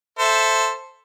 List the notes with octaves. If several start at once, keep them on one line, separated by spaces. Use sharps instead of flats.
A4 C5 E5